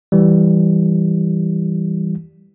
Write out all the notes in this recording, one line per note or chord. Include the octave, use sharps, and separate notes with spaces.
E3 G3